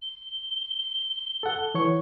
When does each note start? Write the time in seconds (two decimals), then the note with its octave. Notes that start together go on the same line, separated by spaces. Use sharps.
0.02 G7
1.43 A4 F#5
1.75 E3 C#5 C#6